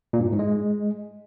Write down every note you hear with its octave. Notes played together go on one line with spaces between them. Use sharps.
A#2
G2
A2
G#2
G#3